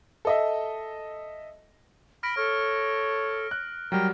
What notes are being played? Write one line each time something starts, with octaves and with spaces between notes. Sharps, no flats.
A4 D#5 E5
B5 F6 A#6 D7
A4 C#5 F6
F#6
F#3 G3 A#4 G5